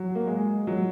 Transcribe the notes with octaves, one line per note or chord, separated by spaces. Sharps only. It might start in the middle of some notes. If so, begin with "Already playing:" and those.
Already playing: F#3
A#3
G#3
F#3